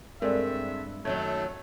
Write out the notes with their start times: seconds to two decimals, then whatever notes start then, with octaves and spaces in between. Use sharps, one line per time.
0.22 G2 G#3 C4 A4 A#4 D5 E5
1.05 F#2 D#3 F#3 A3 G#6